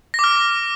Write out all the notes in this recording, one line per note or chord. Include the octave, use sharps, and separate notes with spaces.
D6 F6 A#6